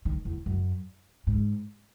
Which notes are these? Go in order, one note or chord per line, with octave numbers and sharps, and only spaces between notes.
D#3
E2
F#2
G#2